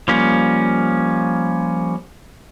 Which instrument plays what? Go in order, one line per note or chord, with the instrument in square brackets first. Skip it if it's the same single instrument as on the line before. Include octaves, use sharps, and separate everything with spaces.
[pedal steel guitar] F3 G3 A#3 C#4